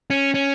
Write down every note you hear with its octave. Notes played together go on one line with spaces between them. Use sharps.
C#4
C#4